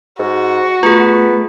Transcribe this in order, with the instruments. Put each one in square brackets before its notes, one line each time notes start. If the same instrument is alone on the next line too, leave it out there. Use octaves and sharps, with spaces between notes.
[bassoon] G#2 [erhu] F#4
[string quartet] A3 [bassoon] B3 [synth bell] F4 G#4